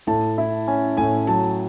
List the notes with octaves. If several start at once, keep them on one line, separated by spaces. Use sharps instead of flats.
A2 A5
E4
C#4 G#5
A2 G#5
F#3 A5